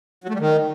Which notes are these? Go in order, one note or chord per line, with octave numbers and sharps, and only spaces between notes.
F#3
A3
G3
D#3